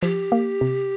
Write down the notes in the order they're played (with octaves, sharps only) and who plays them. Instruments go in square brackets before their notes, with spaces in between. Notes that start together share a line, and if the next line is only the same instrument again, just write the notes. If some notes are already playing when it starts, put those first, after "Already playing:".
[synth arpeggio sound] F3 [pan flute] G4
[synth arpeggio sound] A#3
C3